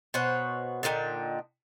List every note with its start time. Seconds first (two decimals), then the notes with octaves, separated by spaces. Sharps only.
0.14 B2 C5 C#5 F#5
0.83 A#2 D3 D#4 G5